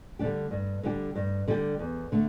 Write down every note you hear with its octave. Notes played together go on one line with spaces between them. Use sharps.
D3 G3 D4 G4
G2
D3 G3 D4 G4
G2
D3 G3 D4 G4
E2
D3 A3